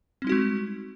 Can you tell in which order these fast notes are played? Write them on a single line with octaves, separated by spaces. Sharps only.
C4 G3 D#4 F#4 G#3